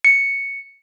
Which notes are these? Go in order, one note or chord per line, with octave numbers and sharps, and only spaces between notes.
C#7